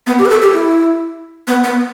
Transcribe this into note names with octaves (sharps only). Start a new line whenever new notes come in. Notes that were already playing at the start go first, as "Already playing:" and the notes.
B3
G4
B4
A4
G4
E4
B3
B3